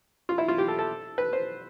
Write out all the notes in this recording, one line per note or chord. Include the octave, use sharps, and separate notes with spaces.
F4
E4
F4
G4
A4
A4
B4
C5